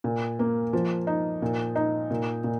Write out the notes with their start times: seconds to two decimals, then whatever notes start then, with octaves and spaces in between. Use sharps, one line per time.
0.04 A#2
0.39 A#3
0.73 F3
1.07 D#4
1.42 A#2
1.76 D#4
2.11 A#2
2.44 A#2